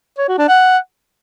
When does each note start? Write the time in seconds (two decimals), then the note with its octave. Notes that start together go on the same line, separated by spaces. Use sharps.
0.18 C#5
0.28 F#4
0.39 D4
0.49 F#5